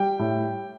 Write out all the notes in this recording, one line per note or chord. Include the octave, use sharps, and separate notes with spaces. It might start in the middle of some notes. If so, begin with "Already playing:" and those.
Already playing: G3 G5
A2